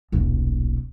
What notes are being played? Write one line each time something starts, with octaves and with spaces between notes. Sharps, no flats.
D#1 B1